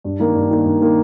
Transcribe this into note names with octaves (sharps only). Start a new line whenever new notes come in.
G2
D#3 A#3
G2
D#3 A#3
G2
D#3 A#3